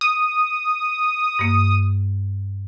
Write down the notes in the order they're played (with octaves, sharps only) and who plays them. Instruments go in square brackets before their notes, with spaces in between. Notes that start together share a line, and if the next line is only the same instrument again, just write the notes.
[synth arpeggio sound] D#6
[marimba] G2 A#3